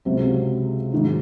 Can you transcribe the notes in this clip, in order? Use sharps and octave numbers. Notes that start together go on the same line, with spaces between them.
C#2 C3 F#3 C4 F#4
G#2 D#3 F#3